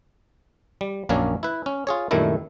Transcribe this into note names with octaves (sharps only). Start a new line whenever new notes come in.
G3
A#1 F#2 A#3 C#4 D4 C#5
E4 B4
C#4
F4 G#4 C#5
F#2 A#2 D#3 G3 A3 E4